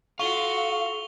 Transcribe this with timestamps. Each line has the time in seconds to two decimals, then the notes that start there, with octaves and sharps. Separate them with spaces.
0.20 F4 F#4 A4 F5 C#6 F7 G7